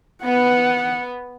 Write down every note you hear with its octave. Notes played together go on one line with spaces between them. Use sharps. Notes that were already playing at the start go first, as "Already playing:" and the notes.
B3 F#5